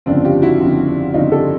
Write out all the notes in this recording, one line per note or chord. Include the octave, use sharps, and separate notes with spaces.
G1 F2 C#3 C4 D4
F4 G4
E4 F#4
G1 F2 C#3
G1 F2 C#3 D#4 F4
G4 A4